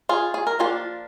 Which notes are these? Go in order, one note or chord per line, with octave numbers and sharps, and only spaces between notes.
F4 G#4
G#4
A#4
F3 A#3 D4 F4 G#4